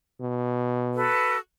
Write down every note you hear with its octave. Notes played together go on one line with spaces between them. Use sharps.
B2
F#4 A4 B4